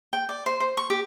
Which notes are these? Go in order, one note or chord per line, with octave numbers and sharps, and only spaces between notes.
G5
D5
C5
C5
C#6
G4